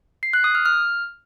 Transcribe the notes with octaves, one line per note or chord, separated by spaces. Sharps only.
C7
F#6
D#6
F6
F6